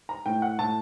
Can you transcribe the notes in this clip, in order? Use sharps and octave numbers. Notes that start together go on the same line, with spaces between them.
A#5
A2 G5
F#5
A2 A5